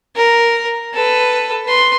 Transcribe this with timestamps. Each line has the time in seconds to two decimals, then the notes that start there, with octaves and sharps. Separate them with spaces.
0.16 A#4
0.94 A4 B4
1.65 B4 C6